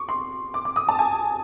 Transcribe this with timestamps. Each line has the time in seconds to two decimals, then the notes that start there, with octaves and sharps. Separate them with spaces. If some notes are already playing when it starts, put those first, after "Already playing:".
Already playing: C#6 D6
0.09 C6
0.54 D6
0.65 D6
0.76 D#6
0.89 A5
0.99 G#5